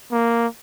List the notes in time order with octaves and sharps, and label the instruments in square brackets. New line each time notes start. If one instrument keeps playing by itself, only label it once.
[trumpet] A#3